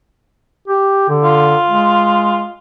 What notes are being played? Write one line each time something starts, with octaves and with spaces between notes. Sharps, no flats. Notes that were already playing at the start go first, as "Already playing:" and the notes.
G4
D3
F4
G#3